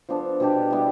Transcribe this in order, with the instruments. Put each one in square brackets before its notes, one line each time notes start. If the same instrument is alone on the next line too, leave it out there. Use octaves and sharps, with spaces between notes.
[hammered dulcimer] F3 B3 D4 A4
B2 G3 D4 G4
G3 B3 E4